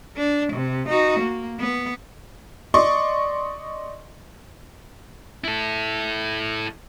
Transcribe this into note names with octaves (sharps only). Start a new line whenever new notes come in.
D4
C3
D#4 F#4
A#3
B3
D5 D#5 C6 C#6
E4 A4